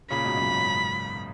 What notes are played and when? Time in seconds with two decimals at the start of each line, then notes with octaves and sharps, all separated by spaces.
0.10 A#2 C#3 B5
0.25 G#2 B2
0.37 F#2 A#2
0.51 G#2
0.65 G#2